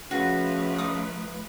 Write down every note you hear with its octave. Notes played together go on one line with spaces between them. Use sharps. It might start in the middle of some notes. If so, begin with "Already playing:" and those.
C#3 F3 A3 F#4 B4
D#4 D#6